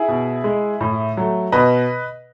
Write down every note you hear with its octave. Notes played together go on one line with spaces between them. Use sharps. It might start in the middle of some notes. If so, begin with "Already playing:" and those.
Already playing: E4 G#4
B2
G#3
A2
F#3 A3
B2 B4 D#5